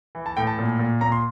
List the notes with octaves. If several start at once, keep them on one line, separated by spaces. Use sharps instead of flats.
E3
A5
A2 G5
A5
A#2
A#2
A#2 A#5
C6